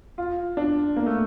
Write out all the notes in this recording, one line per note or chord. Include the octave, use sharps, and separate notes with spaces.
F4
D4
A#3
A3